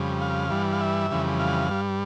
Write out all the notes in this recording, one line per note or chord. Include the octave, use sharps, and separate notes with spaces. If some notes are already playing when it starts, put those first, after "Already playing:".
Already playing: F2 C#3 G3
F5
G2 E3 G3
F5
E5
F2 C#3 E3 G3
F5
G2 G3